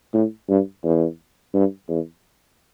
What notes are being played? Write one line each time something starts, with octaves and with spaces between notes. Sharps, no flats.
A2
G2
E2
G2
E2